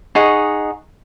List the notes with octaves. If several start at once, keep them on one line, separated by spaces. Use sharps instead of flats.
D#4 G#4 F#5 C#6